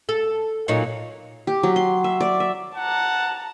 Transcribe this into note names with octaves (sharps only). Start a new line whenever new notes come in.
A4
A#2 F#3 D#4
G4
F#3
C6
E5
D5
E5
F#5 A5 A#5